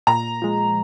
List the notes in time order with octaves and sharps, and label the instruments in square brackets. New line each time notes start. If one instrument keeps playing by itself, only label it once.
[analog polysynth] A#2 [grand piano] A#5
[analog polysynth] F3 G#3